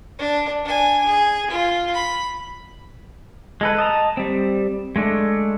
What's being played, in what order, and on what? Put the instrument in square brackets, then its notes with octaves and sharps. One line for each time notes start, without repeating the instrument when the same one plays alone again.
[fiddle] D4
D4 G#5
G#4
F4
B5
[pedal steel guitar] G#3 A4 B4
D#5 A5 A#5
G3 C4
G#3 A3 D4